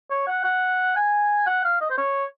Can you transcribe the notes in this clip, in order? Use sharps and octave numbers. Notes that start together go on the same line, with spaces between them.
C#5
F#5
F#5
G#5
F#5
F5
D#5
C5
C#5